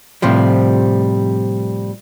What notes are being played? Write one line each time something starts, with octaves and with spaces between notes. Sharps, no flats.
A2 C3 F3 G3